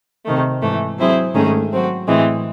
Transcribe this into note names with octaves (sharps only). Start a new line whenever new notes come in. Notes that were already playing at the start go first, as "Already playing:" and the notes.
C3 D#3 A3
G#2 E3 A3
F#3 C4 E4 G#4 C5
G#2 D#3 A3 C#4 G#4
F#3 C4 F#4
A2 E3 G#3 C4